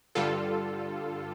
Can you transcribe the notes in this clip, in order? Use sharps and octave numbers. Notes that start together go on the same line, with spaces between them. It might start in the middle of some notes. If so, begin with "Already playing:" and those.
G2 D3 G3 F4 A4